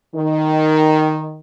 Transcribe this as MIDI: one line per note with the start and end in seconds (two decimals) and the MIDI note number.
0.15 1.39 51